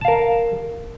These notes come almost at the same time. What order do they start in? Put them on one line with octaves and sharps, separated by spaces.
A5 F5 A#4